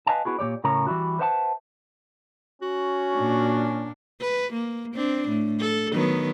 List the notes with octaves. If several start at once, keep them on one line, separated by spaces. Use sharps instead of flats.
B4 D5 D#5 F5 G#5 A5
B3 E4 F#4 G#4
A#2 F3 G4 C#5 D5
A2 C#3 A#4 C#5 A#5
E3 G3 E4 F#4
B4 C5 E5 F#5 G#5 A5
C#4 F#4
A#2 D4
B4
A#3
C4 D4
A2
A4
D#3 F#3 B3